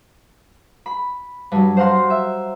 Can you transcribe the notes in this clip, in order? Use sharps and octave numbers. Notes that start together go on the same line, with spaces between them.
B5
G2 F#3
C5 F5 F#5 A#5 C6
E5